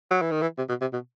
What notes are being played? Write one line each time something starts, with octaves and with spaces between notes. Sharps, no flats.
F#3
E3
D#3
E3
C3
B2
C3
B2